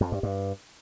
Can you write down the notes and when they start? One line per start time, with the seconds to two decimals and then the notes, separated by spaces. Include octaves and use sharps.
0.01 F2
0.12 G2
0.23 G2